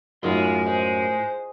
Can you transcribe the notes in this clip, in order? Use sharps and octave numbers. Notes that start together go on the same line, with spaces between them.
F#2 A2 G#3 D#4 F4 C6
G#3 C5